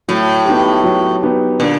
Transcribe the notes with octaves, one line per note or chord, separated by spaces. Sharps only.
A2 F#3
B3 D#4 G4
F#3
B3 D#4 G4
A#2 D3